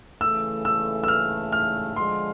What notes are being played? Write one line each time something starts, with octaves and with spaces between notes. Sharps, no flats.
C#3 E3 A3 E6
E6
E6
F6
F6
D3 F3 G#3 C6